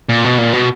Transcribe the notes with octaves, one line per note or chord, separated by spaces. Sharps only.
A#2
B2
A#2
B2